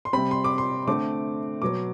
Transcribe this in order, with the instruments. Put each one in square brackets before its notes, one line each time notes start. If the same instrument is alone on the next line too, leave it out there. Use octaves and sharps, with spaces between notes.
[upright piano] C6
C3 G3 C4 B5
C6
D6
C6
D3 A3 C4 D6
B2 F#3 B3 D6